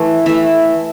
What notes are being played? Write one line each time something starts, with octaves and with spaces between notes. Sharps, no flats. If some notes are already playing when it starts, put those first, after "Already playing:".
Already playing: E3 A3
E3 A3 E5